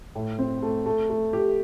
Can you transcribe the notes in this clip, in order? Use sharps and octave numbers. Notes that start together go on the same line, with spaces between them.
A2
C4
A3
A3
A3
G4